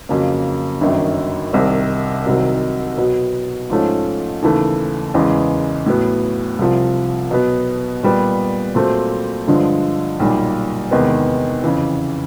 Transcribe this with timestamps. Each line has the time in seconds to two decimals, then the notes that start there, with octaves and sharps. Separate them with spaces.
0.09 F2 C#3 F#3 A#3
0.81 G1 F#2 D#3 F#3
1.53 C2 C3 D#3
2.26 C2 C3 D#3 F#3
2.98 B2 F#3 B3
3.70 G#2 F3 A3 C#4
4.42 D#2 C#3 E3 A3
5.14 E2 C#3 E3 G#3
5.86 A2 F#3 B3
6.59 C2 C3 F3
7.31 B2 F#3 B3
8.03 A#2 G3 B3
8.75 A#2 F#3 A3 C4
9.47 G2 D3 F3 G#3
10.20 B1 A#2 G3
10.91 E2 C3 D#3 G#3 B3
11.64 F2 C#3 E3